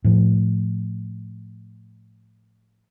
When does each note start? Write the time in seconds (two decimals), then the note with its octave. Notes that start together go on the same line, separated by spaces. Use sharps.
0.04 A2 F3